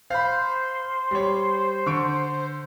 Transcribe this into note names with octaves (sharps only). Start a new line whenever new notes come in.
C5 F5 B5
G3 C#5
D3 C#6 D7